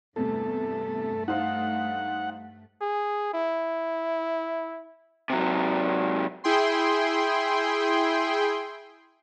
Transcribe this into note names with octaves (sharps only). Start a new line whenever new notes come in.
E2 G2 C3 A3 A4
D#4 C5 F5 F#5
G#4
E4
C3 F#3
E4 G#4 G5 C6